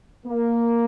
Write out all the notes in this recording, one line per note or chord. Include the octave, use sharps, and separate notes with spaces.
A#3